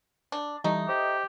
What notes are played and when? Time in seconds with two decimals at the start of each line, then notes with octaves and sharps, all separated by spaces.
0.32 D4
0.64 E3 G3 A3 D#4
0.89 G4 C5 D#5